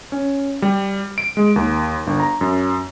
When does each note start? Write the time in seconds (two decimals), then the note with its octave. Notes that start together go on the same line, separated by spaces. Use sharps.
0.12 C#4
0.62 G3
1.18 D7
1.37 G#3
1.56 D#2
2.07 G1
2.20 A#5
2.41 F#2